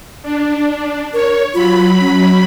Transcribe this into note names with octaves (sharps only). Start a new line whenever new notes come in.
D4
A#4 C#5
F#3 F4 B5
C#4